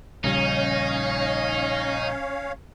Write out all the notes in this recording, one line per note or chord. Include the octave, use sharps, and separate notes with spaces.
A#1 C#3 G3 C#4 D#4 C#5 F5